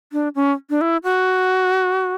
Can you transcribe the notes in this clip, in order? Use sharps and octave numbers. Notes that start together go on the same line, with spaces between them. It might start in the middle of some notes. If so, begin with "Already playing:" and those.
D4
C#4
D4
E4
F#4